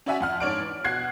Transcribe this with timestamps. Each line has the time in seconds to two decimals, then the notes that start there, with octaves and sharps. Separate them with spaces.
0.06 C#4 F#4 D5 E5 F#5 G#5
0.20 F2 F#5 F6
0.40 G#2 D4 C#5 D5 D7
0.61 E3
0.84 B2 F#5 F#6 G#6 C7